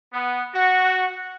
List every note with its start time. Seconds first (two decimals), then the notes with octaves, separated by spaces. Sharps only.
0.13 B3
0.54 F#4